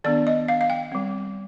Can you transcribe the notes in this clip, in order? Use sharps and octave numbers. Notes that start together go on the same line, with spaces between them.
D#3 B3 D4 D5
D#5
F5
F5
G5
G3 C4